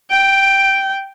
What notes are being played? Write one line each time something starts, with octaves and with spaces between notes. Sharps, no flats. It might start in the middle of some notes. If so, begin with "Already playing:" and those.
G5 D7